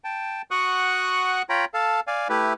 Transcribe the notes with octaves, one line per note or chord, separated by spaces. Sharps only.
G5 A5
F#4 F#5 C#6 D#6 F#6
F4 C#5 G5 A#5 B5
A4 F5 A5
D5 F5 G#5
A3 E4 G4 B4